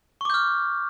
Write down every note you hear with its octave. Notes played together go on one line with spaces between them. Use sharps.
C#6 D6 F6 G6